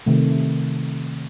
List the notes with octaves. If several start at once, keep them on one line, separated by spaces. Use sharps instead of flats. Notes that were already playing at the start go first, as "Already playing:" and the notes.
C3 D#3 A3